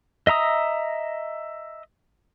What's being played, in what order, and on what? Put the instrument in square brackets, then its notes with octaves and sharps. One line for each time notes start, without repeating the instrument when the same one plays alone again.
[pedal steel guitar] D#5 E5 A#5 D#6